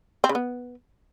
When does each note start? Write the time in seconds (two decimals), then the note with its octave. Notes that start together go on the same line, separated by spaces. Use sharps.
0.24 C4
0.29 C#3
0.35 B3